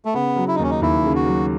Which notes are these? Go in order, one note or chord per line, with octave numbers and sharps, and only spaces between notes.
A3
C#3 B3
F#3
E4
D#4
D#2 C#4
D#4
D#2 E4
C#3
F#4
F#3